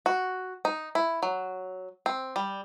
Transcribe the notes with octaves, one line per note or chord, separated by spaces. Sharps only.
F#4
D#4
E4
F#3
C4
G3